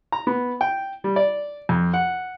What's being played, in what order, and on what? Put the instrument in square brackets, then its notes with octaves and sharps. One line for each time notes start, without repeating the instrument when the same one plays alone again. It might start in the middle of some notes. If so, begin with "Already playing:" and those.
[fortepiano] A#5
B3
G5
G3
D5
F2
F#5